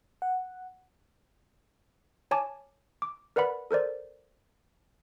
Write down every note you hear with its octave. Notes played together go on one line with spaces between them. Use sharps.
F#5
C#5 G#5 A5 D6
D6
A#4 B4 D5 F#5 B5
A4 A#4 C5 D5